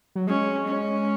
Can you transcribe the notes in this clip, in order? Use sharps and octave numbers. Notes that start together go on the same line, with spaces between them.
F#3
G#3 C#4
C#4